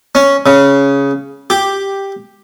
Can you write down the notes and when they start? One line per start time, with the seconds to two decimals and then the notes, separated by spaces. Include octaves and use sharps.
0.15 C#4
0.46 C#3
1.50 G4